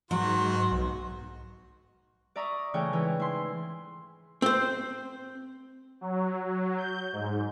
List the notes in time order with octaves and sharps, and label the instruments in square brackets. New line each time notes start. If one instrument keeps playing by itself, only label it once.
[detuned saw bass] G#2 [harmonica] D#3 F#4 [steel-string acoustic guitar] F#3 [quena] C6
[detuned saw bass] B1
[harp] D5 E5 A#5 C#6 D#6
A2 C#3 E3 C#5 G5
G#2 E3
E4 C6
[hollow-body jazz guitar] C4 C5
[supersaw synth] F#3
F#3
G6
G#2